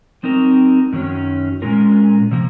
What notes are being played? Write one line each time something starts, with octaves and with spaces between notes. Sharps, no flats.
F#3 C4 D#4 A#4
F#2 D#3 F#3 C#4
A#2 G#3 C#4 F4 A#4
C3 F3 A#3